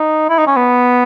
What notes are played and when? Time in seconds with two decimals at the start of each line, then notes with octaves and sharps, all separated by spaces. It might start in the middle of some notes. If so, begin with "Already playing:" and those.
Already playing: D#4
0.29 E4
0.39 D#4
0.47 C#4
0.56 B3